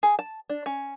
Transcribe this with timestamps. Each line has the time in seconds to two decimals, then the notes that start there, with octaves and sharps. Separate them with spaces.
0.03 G#4
0.19 A5
0.50 D4
0.66 C#4